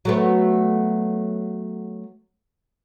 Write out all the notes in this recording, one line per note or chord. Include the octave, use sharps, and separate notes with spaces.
F#3 A3 B3